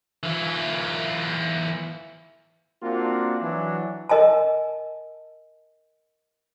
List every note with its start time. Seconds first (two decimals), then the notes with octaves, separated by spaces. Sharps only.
0.23 E3 F4
2.82 A#3 C4 D4 F4 F#4
3.40 E3 F#3 D4 E4
4.09 A#4 D#5 G#5 A5